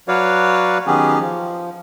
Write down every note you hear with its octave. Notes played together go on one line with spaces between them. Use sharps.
F#3 F#4 B4 C#5 D5 F5
D#3 F#3 B3 C#4 G4 G#4
F3